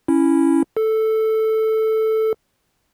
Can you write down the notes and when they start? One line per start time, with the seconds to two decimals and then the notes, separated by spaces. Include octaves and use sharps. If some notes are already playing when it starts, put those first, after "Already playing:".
0.08 C#4 E4
0.77 A4